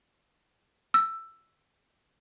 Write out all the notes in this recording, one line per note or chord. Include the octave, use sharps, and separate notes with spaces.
E6